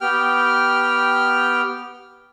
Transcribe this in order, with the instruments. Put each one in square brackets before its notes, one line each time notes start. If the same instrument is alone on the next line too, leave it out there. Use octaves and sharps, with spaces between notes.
[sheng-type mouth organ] B3 G4 G5 F6